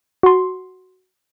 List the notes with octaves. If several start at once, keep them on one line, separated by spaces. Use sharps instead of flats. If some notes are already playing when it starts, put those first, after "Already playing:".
F#4 C6